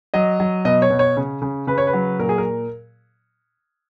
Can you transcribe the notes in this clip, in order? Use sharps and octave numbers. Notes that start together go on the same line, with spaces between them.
F#3 D#5
F#3
B2 D#5
C#5
B2
C#5
C#3
C#3
C#3 B4
C#5
B4
F#3
A#2 A#4
G#4
A#4